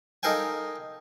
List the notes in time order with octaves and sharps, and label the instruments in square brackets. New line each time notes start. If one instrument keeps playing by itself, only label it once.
[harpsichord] D#4 A4 A#4 F5 G5 G#5